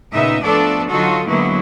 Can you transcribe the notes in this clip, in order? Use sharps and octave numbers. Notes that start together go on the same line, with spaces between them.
A#2 C#3 B3 D#4 E5
F3 A3 B3 D4 A4 D5
D3 F#3 D#4 F4 F#4 A4
D3 F#3 G#3 A#3 B3 E4